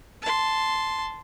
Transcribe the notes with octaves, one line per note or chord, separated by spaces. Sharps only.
A5 C6